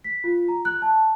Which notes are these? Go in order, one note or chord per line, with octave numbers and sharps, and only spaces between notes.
B6
F4
A#5
F#6
A5